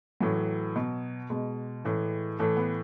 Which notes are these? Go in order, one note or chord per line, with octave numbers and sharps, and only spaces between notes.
A2 E3 F#3
B2
B2 G#3
A2 E3
A2 E3 A3
B3